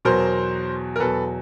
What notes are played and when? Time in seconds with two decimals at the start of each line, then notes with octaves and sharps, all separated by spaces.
0.05 E2 B2 F#3 A#4 C5
0.96 A#4
0.99 E2 B2 F#3 A4 B4